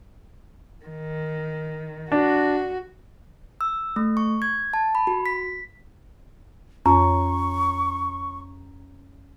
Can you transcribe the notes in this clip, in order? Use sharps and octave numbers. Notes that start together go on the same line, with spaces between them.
D#3
D4 F#4
E6
A3
C#6
G#6
A5
B5
F#4
B6
F2 C#4 A#5 C#6